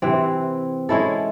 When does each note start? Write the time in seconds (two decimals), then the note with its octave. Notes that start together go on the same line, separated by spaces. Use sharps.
0.02 C3 E3 C4
0.89 G#3 C#4 E4 A4